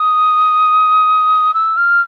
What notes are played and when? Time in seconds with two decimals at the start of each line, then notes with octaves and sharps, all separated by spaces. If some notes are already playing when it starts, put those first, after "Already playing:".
Already playing: D#6
1.54 E6
1.77 F6